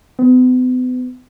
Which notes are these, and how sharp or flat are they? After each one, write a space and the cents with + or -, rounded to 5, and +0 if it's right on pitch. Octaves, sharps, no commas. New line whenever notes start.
B3 +40